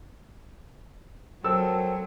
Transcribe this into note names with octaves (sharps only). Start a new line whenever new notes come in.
F#3 C4 A4 A#4 E6